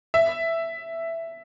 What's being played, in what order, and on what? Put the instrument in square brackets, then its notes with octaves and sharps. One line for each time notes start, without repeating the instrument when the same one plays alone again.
[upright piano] E5